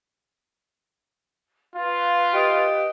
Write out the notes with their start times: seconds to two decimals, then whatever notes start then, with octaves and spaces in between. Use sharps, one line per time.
1.75 F4 B4 F5
2.34 G4 D#5